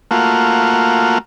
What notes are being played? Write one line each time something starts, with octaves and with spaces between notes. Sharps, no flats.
A3 A#3 F4 F#4